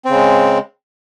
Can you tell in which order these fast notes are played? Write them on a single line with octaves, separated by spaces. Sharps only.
C4 C#3 G#3